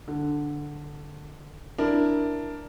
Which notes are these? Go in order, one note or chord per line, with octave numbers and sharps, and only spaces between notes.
D3
D4 E4 A#4